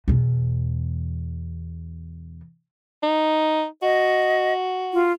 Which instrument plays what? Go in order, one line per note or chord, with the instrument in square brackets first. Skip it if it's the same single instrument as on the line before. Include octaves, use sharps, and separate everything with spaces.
[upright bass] E2 B2
[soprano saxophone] D#4
[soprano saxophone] F#4 [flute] D#5
[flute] F4